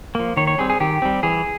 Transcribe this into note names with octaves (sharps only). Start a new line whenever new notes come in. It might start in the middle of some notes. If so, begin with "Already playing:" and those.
F3 A#3
D#3 C#5
C#5
G3 C4 G#4
G#4
D#3 G4
G3 C4
E3 G#4